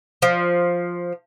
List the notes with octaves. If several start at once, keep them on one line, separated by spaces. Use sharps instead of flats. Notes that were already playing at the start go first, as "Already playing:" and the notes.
F3